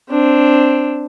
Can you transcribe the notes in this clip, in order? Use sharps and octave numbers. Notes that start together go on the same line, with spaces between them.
C4 D4